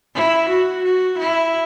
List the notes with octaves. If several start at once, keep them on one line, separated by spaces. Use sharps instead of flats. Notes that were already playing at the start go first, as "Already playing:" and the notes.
E4
F#4
F#4
E4